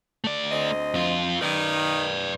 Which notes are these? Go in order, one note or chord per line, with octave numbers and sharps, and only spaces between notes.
A3 D5
D2 C4 D#5
F2 F4
D#3 B4 D5